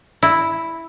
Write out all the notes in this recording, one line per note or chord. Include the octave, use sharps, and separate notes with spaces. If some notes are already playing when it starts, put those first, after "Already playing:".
E4